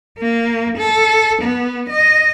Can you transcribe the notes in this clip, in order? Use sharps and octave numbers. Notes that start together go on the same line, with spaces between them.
A#3
A4
B3
D#5